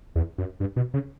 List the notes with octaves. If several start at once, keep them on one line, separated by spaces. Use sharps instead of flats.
E2
F#2
G2
B2
C#3